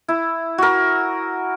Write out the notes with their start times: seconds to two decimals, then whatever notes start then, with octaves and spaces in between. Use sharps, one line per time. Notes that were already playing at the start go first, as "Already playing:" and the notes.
0.08 E4
0.58 F#4 A#4